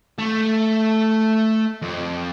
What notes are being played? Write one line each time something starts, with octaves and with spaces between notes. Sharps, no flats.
A3
F2